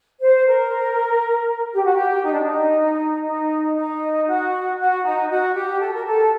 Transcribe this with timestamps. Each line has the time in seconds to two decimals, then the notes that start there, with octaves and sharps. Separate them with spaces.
0.21 C5
0.47 A#4
1.73 G4
1.84 F#4
1.95 G4
2.24 D#4
2.32 D4
2.42 D#4
3.26 D#4
3.77 D#4
4.27 F#4
4.79 F#4
5.04 D#4
5.30 F#4
5.55 G4
5.80 A4
5.93 A#4
6.06 A4